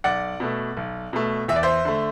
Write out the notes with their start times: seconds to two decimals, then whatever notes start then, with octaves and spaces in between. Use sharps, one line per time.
0.04 B1 D5 F#5
0.40 B2 A3
0.77 B1
1.13 B2 A3
1.48 E2 E5
1.56 D5
1.63 C5 E5
1.85 D3 A3